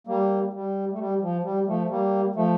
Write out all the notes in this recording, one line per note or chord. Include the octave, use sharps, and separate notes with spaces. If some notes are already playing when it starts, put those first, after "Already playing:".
G3 A#3
G3
A3
G3
F3
G3
F3 A3
G3 A#3
F3 A3